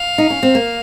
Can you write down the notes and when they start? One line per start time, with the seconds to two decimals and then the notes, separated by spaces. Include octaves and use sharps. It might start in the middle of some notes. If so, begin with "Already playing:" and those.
Already playing: F5
0.18 D#4
0.30 C#4
0.43 C4
0.55 A#3